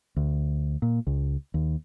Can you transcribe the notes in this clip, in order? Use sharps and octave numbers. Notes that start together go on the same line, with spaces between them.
D2
A#2
C#2
D#2